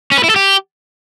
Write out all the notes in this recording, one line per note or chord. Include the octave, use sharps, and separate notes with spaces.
C#4
B4
E4
A4
G4